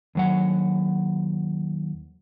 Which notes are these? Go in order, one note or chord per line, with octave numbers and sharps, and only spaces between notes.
D#2 F#3 F#5